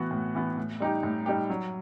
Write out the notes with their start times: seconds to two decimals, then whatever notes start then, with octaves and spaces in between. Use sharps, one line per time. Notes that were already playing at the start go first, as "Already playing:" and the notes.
Already playing: A2 E3 B3 F#4
0.11 A2
0.35 E3 B3 F#4
0.57 A2
0.80 G3 D#4 G4
1.03 A2
1.26 G3 D#4 G4
1.50 F#3